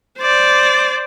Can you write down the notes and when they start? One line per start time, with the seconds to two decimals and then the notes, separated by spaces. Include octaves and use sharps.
0.18 C5 D5